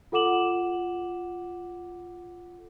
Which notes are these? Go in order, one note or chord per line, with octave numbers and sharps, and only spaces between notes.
F4 A4 F#5 D6 E7 F#7